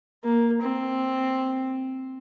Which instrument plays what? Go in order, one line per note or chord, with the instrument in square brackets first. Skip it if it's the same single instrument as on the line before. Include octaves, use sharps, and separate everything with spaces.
[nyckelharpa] A#3
C4